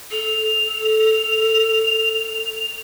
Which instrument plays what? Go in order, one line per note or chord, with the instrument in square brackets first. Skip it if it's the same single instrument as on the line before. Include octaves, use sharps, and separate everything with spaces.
[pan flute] A4 [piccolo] F7